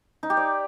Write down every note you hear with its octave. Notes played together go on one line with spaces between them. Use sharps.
D#4
G4
D5